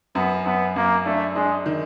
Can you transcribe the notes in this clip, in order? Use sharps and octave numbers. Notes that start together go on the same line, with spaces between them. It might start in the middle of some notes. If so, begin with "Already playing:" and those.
F#2 B3
F#2 B3
F#2 A#3
A3 D4
G#3 D4
D#3